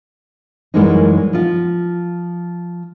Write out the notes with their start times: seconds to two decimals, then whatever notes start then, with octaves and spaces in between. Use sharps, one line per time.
0.74 F#2 E3 G3 G#3 A#3 D#4
1.33 F3 F4